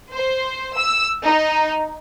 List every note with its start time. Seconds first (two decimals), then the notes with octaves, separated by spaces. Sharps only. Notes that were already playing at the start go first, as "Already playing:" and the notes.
0.13 C5
0.78 E6
1.25 D#4